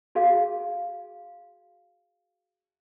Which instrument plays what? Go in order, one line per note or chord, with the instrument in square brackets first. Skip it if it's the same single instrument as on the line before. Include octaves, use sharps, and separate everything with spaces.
[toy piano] F#4 G#4 F5